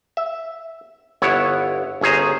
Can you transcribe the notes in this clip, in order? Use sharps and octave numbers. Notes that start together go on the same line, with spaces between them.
E5
G1 B3 E4 C#5 F#5
G1 C#4 G#4 C5 A#5